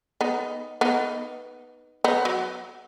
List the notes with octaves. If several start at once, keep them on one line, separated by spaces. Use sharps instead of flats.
B3 D#4
B3 D#4
B3 D#4
F#3